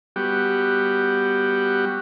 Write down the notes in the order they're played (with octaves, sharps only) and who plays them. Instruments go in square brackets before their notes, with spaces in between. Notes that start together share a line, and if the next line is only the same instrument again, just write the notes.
[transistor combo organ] G3 B3 F#4 G4